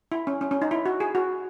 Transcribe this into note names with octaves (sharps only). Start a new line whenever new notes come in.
E4
C#4
C#4
C#4
D#4
E4
F#4
G#4
F#4